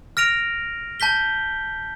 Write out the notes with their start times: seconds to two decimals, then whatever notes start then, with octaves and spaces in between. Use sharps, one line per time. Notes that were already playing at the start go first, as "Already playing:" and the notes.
0.17 F6 A#6 D7 F7
1.00 A5 G6 B6 G7